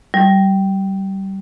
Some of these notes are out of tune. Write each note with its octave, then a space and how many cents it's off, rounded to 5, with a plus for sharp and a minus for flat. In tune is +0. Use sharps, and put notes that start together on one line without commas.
G3 -25